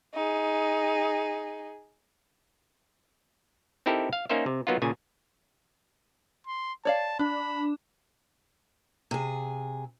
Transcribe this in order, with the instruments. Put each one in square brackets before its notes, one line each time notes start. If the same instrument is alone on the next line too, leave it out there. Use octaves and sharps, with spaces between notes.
[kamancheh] D#4 G#4
[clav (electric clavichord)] C4 D#4 E4 G4 A4 A#4
F5
A#3 C#4 D#4 A#4 C5 E5
C3
F#3 A#3 B3 D#4 F4
A#2 C#3 G#5
[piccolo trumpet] C6
[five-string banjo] C#5 D5 F5 [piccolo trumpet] A5
[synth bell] D4 [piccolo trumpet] B5
[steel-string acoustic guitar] C3 G#4